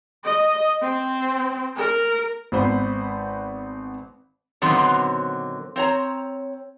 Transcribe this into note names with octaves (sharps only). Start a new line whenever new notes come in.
D#5
C4
A#4
G#1 B3 C5 B5
A#2 D3 D#3 F#3 B3 C4
C4 C#5 A#5